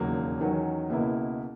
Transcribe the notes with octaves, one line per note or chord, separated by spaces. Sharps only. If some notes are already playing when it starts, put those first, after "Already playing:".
Already playing: E1 D#2 C#3 F#3 A#3
E2 D#3 F#3 C#4
C#2 B2 A#3 E4